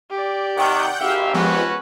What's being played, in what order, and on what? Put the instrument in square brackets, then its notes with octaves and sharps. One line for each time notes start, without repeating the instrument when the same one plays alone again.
[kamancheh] G4 D5
[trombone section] C3 D#3 [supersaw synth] F#5 G5 G6
[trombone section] G#1 [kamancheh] G4 [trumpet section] E5 F5
[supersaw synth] F3 G#3 B3 [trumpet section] C#4 F#4 B4